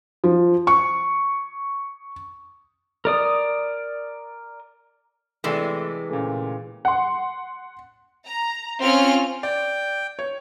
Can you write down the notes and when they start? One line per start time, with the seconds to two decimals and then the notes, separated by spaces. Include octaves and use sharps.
0.24 F3
0.67 C#6
3.05 A#4 D5 D#6
5.44 C3 E3 G#3 A3 D5 E6
6.09 A#2 C#3 A3
6.85 F#5 C6
8.24 A#5
8.80 C4 C#4 F4 F6
9.43 D5 G5
10.19 C#5